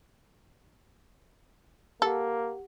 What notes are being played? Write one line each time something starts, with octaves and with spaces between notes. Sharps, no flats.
A#3 G4 A4 F#5